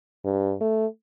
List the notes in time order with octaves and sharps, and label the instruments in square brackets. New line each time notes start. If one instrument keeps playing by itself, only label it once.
[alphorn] G2
A3